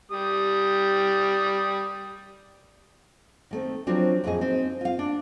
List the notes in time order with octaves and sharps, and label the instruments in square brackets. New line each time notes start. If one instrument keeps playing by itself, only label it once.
[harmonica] G3 G4 D#6
[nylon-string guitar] D#3 A3 C4
F3 F#3 C4 D4
F2 A2 A3 D#4 G#4 D#5
C4 D#4
F4 F5
D4